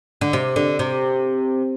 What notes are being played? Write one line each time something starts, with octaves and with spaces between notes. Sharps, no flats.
D3
C3
D3
C3